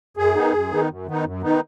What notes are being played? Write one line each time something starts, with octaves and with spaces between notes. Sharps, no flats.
F#2 G#4
D#3 B3 D#4
F#2
D#3 B3 D#4
F#2
D#3 B3 D#4
F#2
D#3 B3 D#4